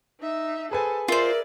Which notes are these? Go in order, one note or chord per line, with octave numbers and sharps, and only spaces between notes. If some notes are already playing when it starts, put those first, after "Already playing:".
D#4 E5
G#4 A4 B4 C5 G#5
F4 A#4 C5 D5 E5